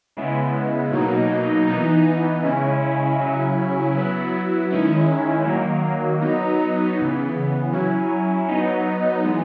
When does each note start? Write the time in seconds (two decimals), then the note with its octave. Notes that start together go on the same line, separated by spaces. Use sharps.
0.17 C#3 G#3 B3 E4
0.92 B2 F#3 A#3 D#4
1.67 E3 B3 D#4
2.43 C#3 G#3 C#4 E4
3.19 C#3 F#3 C#4 E4
3.95 F#3 B3 E4
4.71 D#3 G#3 C#4 E4
5.46 D#3 F#3 A#3
6.21 F#3 B3 D#4
6.97 C#3 E3 B3
7.72 F#3 C#4 E4
8.48 F#3 B3 D#4
9.24 E3 G#3 B3